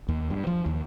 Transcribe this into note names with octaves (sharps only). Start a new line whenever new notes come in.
D#2
G2
F3
D#2